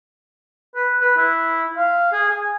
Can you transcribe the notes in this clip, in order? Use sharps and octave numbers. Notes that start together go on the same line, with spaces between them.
B4
B4
E4
F5
G#4
G#5